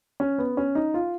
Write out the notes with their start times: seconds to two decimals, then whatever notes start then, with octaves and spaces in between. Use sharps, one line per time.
0.20 C#4
0.38 B3
0.57 C#4
0.75 D#4
0.94 F4